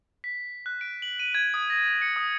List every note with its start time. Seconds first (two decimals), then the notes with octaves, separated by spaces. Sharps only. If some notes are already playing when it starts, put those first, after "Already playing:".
0.24 B6
0.66 F#6
0.81 D7
1.02 F#7
1.20 D#7
1.35 G#6
1.54 D#6
1.70 A#6
2.02 C#7
2.16 D#6